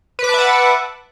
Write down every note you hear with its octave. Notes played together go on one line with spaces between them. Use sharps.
B4 E5 F#5 A5 D6